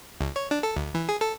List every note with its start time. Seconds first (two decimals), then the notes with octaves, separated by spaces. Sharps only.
0.21 C#2
0.36 C#5
0.51 D4
0.63 A4
0.76 D2
0.95 E3
1.09 G#4
1.21 A4